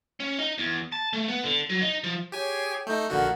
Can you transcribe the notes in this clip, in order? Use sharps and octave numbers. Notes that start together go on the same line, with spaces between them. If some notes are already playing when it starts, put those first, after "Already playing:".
C#4
D#4
E2
A5
A3
B3
D3
F#3
D#4
F3
G4 G#4 C#5 G5 G#5
A3 D#4 G6
A#1 D3 F#4 A#4 F#5